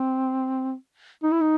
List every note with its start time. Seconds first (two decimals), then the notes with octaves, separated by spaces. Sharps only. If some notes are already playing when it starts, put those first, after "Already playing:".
Already playing: C4
1.23 D#4
1.32 E4
1.41 D#4